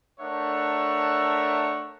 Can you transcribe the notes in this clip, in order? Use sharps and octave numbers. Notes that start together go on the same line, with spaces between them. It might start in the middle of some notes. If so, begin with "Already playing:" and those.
A3 D4 A#4 C#5 E5 F#5